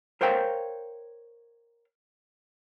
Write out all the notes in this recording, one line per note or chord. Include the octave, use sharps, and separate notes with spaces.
A#4 C5 C#5 F5 G5